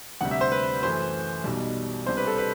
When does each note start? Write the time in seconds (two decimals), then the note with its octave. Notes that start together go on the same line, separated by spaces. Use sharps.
0.21 D2 C3 G3 F#5
0.31 E5
0.41 C5
0.52 B4
0.82 F#2 E3 A3 C5
1.44 B1 B2 G3
2.06 C2 C3 G3 D4 C5
2.17 B4
2.27 A4
2.38 B4